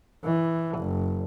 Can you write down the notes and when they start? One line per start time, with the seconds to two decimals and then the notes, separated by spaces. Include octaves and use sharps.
0.24 E3
0.79 F#1